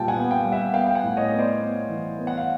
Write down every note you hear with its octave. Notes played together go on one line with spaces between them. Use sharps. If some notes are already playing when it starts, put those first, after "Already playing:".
Already playing: A#2 G3 G5 A5
F#5 G#5
B3
F5 G5
G3
E5 F#5
B3 F5 G5
G5
F#5 G#5
A2
C#5 D#5
B3
C5 D5
B3
E3
B3
F#5
F5